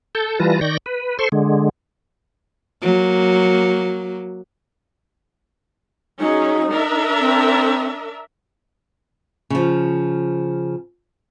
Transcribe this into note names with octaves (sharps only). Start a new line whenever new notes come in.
A4 A5 G6
E3 G3 F4 B4 A5 A#6
D#3 D5 C#6 G6 A#6
B4
A4 C5 C6 C#6
D3 G#3
F#3 A#3
F#3 C#4 D#4 G#4
D4 A#4 E5
C4
C#3 F3